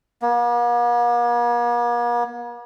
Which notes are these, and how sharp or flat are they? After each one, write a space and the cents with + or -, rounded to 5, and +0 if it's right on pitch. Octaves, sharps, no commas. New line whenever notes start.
A#3 +45